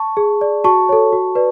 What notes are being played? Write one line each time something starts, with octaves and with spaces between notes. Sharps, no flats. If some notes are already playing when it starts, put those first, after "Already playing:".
Already playing: A5 C#6
G#4
D5
F#4 A5 C#6
A4 C#5
F#4
B4 D5